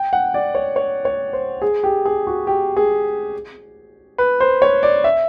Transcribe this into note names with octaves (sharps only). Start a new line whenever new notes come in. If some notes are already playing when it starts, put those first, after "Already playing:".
Already playing: G5
F#5
D5
C#5
C#5
C#5
C5
G#4
G4
G#4
F#4
G4
G#4
B4
C5
C#5
D5
E5